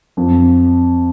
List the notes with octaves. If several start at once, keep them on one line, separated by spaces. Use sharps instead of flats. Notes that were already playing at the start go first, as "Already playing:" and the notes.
F2